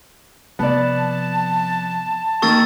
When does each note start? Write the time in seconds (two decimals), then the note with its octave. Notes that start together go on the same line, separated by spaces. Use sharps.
0.59 C3 F3 B3 D5 A5
2.42 D#3 A#3 C#6 E6 A6